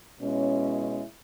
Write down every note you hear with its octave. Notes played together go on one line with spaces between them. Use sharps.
B2 G#3 C#4 E4